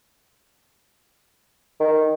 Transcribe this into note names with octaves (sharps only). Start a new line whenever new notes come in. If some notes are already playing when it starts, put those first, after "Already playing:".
D#3